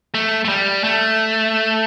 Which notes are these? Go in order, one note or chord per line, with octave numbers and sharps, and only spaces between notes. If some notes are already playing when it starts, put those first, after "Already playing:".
A3
A3
G3
A3